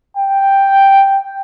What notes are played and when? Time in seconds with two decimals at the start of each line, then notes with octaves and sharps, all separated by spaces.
0.17 G5